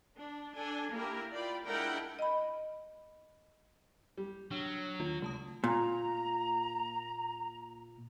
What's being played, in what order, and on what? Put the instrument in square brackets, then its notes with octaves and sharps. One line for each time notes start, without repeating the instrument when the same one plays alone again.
[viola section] D4
D4 A4 G#5
A#3 E4 G4 A#4
F4 D5 G5 B5
G#3 D4 E4 A#4 F#5 G5
[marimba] D#5 B5
[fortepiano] G3
[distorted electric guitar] F#3 [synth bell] D4
[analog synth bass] D#2 [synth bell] F4
[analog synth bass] C#2 [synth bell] A3 A5 D#6
[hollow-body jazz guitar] A#2 [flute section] A#5